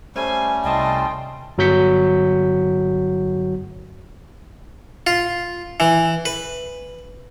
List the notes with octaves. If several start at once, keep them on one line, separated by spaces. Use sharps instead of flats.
G3 A3 C#4 C5 G#5
C2 D#5 G5 A5 C6
G1 F#3 F#4 G6 B6 C#7
F4
E3
B4